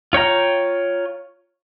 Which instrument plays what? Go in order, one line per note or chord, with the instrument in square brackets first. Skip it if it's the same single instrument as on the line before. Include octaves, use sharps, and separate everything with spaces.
[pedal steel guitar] F4 C#5 G5 A#5